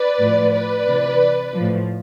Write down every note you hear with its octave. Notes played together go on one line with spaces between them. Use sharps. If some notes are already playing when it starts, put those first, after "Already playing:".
Already playing: B4 D5
A2 F3
B4 D5
C3 E3
A2 F3